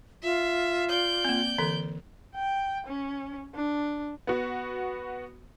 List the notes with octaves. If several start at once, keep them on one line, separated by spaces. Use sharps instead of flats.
F4 E5
D5 G6
A#3 C4
D3 E3 A4
G5
C#4
D4
B3 F#4